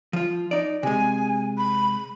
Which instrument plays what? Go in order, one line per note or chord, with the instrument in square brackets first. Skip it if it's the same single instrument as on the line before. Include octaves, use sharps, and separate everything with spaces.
[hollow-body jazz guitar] F3 F4
D#4 D5
[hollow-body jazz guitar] C3 G#3 [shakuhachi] G#5
[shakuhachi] B5